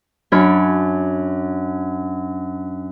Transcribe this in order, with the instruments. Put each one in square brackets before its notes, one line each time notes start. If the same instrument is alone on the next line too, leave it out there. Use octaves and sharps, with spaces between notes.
[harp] F#2 D4 C#5 B5 F6